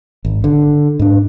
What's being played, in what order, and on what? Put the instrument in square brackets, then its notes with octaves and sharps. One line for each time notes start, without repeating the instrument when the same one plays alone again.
[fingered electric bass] G#1
D3
G#2 D4